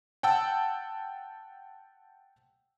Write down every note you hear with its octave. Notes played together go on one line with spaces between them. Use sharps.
F#5 G5 A5 E6